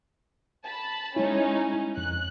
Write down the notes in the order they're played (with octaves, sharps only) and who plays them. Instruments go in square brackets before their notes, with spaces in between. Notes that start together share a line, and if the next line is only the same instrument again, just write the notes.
[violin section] A5 B5
[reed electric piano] G#3 E4 [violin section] C#4 D#4
[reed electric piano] F2 [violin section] F#6